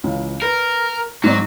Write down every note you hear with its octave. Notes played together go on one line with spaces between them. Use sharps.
C#2 C#3 E3
A#4 B4
G#2 F#3 C4 D5